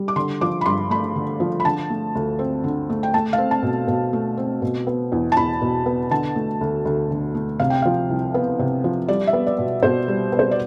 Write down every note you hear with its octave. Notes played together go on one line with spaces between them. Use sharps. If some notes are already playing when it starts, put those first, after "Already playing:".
Already playing: G3
D6
D3 C6
F3 D6
B5
G2 C6
A3 B5
D3
F3
B5
D3 A5
A3
D2
C4
D3
A3
G5
A3 A5
F5
C4
A5
B2
B2
A3
C4
B2
B3
E2
A5
E2 B5
B2
B3
D3 A5
A3
D2
D2
D3
A3
C3 F5
G5
F3 F5
C2
B3
C3
F3
G3 D5
E5
B3
D5
B2
B2 C5
G3
B3
C5
D5